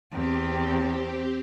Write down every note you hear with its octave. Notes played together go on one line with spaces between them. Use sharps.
E2 C4 G4